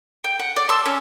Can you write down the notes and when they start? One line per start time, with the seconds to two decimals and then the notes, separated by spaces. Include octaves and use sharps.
0.24 G5
0.40 F#5
0.56 D5
0.69 A5 C6 E6
0.86 C#4